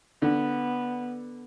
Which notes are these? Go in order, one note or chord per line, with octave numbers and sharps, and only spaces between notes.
D3 B3